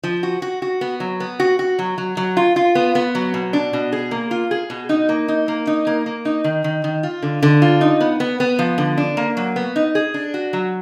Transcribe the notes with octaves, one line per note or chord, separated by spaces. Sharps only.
F3
F#4
F#4
F#4
B3
F#3
B3
F#4
F#4
F#3
F#3
F#3
F4
F4
B3
B3
F#3
B2
D4
B2
G#4
A#3
F4
G#4
B2
D#4
A#3
D#4
A#3
D#4
A#3
A#3
D#4
D#3
D#3
D#3
F4
D3
D3
F4
D#4
B3
B3
B3
F3
D3
D4
A#3
F#3
B3
D#4
G#4
D4
F#4
F#3